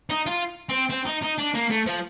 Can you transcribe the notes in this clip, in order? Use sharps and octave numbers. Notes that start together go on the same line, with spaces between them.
D#4
F4
C4
C4
D#4
D#4
D4
A#3
A3
F3